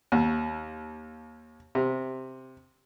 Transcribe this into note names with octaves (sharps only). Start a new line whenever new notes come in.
D#2
C3